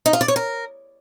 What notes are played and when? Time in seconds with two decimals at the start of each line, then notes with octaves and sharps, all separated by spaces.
0.06 D#4
0.13 F4
0.21 D5
0.28 C#5
0.36 A#4